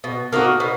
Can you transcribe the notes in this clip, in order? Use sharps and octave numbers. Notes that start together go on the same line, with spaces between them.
B2
A#3 D#4 F#4
B2